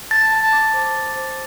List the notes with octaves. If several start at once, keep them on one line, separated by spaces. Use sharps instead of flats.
A5 A6
A5
D6
C5
D6
C5